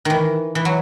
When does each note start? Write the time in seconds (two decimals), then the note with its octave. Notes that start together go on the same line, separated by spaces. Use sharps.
0.05 D#3 E3
0.55 E3
0.65 F#3